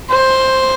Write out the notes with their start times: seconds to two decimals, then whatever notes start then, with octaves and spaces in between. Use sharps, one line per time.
0.11 C5